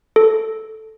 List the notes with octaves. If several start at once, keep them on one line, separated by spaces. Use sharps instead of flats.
A4